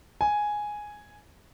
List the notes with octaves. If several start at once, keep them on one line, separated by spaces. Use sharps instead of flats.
G#5